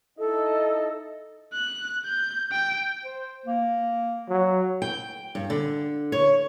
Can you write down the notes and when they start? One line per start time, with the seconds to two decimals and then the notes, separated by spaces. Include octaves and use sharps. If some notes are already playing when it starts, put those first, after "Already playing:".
0.19 D#4 E4 A4 D#5
1.53 F#6
2.05 G6
2.52 G5
3.04 C5
3.46 A#3
4.29 F#3
4.82 G5
5.35 G2
5.50 D3
6.12 C#5